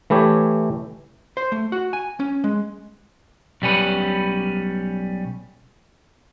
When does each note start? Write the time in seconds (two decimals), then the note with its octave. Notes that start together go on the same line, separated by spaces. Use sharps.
0.10 E3 A3 E4 G4 C#5
1.37 C5
1.52 A3
1.72 F#4
1.93 G#5
2.20 C#4
2.44 G#3
3.62 B1 G3 C#4 B4